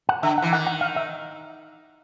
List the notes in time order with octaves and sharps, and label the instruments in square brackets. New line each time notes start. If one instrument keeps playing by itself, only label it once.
[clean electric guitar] F#5
[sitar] D3 [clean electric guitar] E5
[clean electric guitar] F#5
[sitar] E3
[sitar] D#3 [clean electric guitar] F#5
[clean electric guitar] F#5
F5
E5